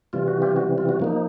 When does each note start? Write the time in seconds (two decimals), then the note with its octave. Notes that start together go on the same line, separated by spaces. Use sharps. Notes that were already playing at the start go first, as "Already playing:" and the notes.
0.13 C3 E3 G3 F4
0.28 F#4
0.42 F4 G4
0.56 F#4
0.78 F4
0.89 F#4
1.00 F3 A#3 D#4